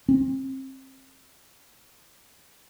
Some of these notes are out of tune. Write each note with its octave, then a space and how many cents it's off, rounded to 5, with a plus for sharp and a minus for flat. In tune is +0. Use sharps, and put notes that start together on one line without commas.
C4 +30